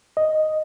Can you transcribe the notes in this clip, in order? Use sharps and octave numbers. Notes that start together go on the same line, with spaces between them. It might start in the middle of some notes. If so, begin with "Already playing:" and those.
D#5